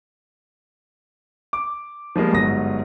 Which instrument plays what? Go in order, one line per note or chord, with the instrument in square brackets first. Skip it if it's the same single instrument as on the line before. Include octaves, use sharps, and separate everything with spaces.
[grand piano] D6
F3 G3 G#3 A#3
G1 G#2 F#3 D#6 A#6